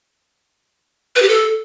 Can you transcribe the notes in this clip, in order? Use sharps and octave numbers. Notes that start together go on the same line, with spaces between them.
B4
G4
A4